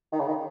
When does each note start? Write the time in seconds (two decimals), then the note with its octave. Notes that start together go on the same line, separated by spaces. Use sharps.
0.12 D#3
0.20 C#3
0.29 D#3